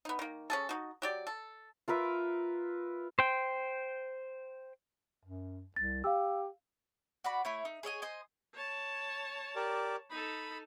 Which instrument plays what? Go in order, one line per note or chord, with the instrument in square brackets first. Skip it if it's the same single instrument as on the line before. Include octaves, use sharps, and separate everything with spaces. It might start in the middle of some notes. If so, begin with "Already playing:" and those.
[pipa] B3 D#4
D#3 A#3
C#4 G#4 A4
D#4 F#4
F#3 G4 D5
A4
[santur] F4 A#4 B4 E5
[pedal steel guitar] C5 G5
[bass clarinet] F#2
[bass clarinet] C2 [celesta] A6
[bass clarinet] G4 [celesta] F5 E6
[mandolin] F#4 D5 B5
A3 E4 C#5
D#4
G#4 C#5 D#5 G#5
C5 D#5 G#5
[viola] C#5 A5
[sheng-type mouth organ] G4 A#4 D5
[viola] D#4 A4 [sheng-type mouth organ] B5